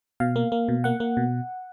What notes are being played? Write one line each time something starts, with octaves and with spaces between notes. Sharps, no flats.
B2 F5
A#3
A#3
B2
A#3 F#5
A#3
B2